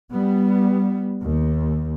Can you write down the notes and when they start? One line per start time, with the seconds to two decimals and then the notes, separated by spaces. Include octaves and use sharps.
0.11 G3 B3
1.23 D#2